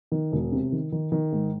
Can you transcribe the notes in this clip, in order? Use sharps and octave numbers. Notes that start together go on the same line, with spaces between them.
D#3
E1
C3
D#3
D#3
D#3
G#2